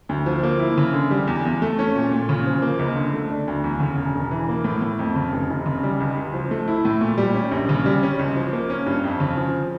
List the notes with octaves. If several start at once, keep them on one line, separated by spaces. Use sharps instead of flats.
D2
F3
A#3
E4
C#3
D3
G3
E2
E2
A3
C#4
A#2
A#2
C#3
F3
A#3
C#2
D3
A3
D4
D2
E2
C#3
E1
E1
E3
A#3
A2
A2
F2
C#3
F1
F1
C#3
G3
C#2
C#2
F3
A3
E4
A2
A#2
G3
C#4
A#1
C#3
G3
C#4
C#2
F3
A#3
C#4
G2
F2
C#3
F3